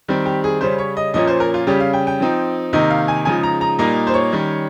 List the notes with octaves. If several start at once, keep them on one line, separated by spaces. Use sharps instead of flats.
D#3 G3 C4
G4
G#4
C#3 G3 C#4 C5
C#5
D#5
A#2 F3 A#3 C#4 D#5
C5
A#4
F4
C#3 G3 C#4 G4
F5
G5
G5
F3 C4 D#4
C3 D#3 A#3 D#4 D#5
F5
G#5
C#3 F3 G#3 D#4 G#5
A#5
A#5
A#2 G3 A#3 D#4 D#5
C5
C#5
D#3 G3 C#4